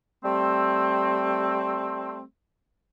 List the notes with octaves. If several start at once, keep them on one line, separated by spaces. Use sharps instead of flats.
G3 A3 C4